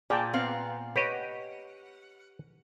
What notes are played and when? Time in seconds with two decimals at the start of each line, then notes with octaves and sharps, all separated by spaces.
0.10 A#2 G#4 D5 G5 A5
0.33 B3 C4 F5
0.96 G4 B4 C#5 D#5 F#5